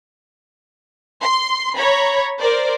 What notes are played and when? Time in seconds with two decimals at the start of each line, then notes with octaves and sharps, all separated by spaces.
1.22 C6
1.76 C#5 A#5 B5
2.39 A#4 C5 D5